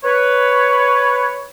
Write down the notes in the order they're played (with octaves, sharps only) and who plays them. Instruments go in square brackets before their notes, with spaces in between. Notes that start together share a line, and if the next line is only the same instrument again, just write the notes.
[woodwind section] B4 C#5